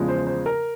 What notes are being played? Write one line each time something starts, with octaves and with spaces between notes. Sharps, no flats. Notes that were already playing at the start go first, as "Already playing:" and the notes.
Already playing: E2 C#3 F3 G#3
C5
C5
A#4